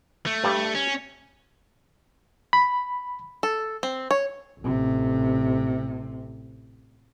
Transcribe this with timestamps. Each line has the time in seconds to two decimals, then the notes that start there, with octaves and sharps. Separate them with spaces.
0.26 A3
0.44 G2 G3 D5
0.75 C#4
2.53 B5
3.43 A4
3.83 C4
4.11 C#5
4.61 A1 C3